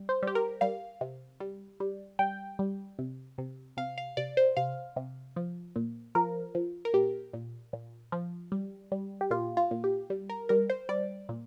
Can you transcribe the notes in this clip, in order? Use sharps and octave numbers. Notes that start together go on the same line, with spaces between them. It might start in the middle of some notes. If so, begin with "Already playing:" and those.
Already playing: G3
C5
G3 G4
A#4
G3 F5
C3
G3
G3
G3 G5
G3
C3
C3
C3 F5
F5
C3 D5
C5
C3 F5
C3
F3
A#2
F3 A#4
F3
A#4
A#2 G4
A#2
A#2
F3
G3
G3
G4
A#2 F4
F4
A#2
G4
G3
A#4
G3 A#4
C5
G3 D5
A#2